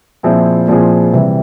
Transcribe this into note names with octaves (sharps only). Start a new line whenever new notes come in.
A#2 F3 C4 E4 G#4
A#2 F3 C4 E4 G#4
C3 E3 G3